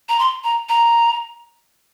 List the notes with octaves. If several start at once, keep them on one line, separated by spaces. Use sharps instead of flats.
A#5
C6
A#5
A#5